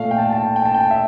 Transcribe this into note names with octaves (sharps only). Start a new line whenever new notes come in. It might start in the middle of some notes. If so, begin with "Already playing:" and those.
Already playing: A#2 A3 F5
G5
A5
G5
A5
G5
A5
G5
E5